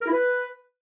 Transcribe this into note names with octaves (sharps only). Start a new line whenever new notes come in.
A#4
E4
B4